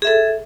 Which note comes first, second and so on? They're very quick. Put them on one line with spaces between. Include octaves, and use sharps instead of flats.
G#4 E5 A4